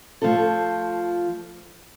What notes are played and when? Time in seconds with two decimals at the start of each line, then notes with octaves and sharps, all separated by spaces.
0.22 F3 A3 F4 A4